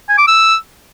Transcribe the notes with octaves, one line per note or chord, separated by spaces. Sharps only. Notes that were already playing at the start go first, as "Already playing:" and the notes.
G#5
D6
E6